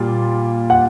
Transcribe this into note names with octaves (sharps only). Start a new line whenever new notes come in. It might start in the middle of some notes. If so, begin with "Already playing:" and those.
Already playing: A#2 G3 F4
F#5